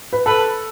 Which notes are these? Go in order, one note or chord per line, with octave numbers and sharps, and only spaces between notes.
B4
A4 B4